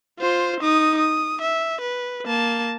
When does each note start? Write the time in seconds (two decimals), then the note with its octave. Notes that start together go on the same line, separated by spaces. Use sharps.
0.19 F4 C5
0.60 D#4 D#6
0.97 D#6
1.41 E5
1.81 B4
2.26 A#3 A5